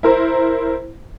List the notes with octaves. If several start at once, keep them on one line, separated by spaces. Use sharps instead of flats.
E4 A#4 C5